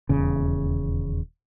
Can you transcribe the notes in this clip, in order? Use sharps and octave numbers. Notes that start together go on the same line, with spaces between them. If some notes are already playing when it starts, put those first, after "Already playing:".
D#1 E2 C#3